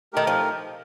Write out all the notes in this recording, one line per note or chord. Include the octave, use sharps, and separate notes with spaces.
D#3 A3 D#4 G4 A#4
F3